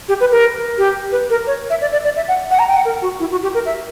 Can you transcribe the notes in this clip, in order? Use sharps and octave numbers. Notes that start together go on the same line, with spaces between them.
G4
B4
A#4
G4
B4
A#4
C#5
E5
D5
D5
D5
E5
F#5
F#5
A#5
G5
F#5
A#4
F#4
E4
F#4
G4
A#4
E5